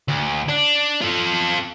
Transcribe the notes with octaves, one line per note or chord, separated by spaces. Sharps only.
D2
D4
F4 A4